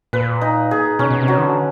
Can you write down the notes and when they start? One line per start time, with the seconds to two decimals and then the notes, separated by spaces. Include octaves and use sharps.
0.13 A#2 B4
0.41 D#4
0.71 G#4
0.99 B2 C#4
1.11 B2
1.21 C3
1.28 F#3
1.38 D#3
1.43 D3